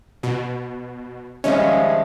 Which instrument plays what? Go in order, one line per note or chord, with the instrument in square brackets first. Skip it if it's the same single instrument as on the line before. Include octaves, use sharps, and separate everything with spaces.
[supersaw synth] B2
[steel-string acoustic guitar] D#3 E5 F5 [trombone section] F3 G3 G#3 [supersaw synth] C#4